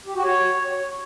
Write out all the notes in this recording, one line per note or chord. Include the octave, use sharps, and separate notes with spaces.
G4
F#4
C#5